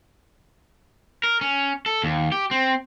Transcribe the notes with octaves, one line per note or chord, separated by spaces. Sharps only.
A#4
C#4
A4
D#2
G4
C4